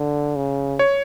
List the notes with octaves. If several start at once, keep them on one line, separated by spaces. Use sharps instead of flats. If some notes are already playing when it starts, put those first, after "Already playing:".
Already playing: D3
C#3
C#5